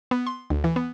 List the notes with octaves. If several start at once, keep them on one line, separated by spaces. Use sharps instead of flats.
B3
C6
D2
E3
B3